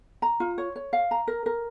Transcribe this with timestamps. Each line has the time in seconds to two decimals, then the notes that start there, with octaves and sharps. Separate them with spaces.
0.22 A#5
0.40 F4
0.58 C#5
0.76 C#5
0.93 F5
1.11 A#5
1.27 A#4
1.46 A#4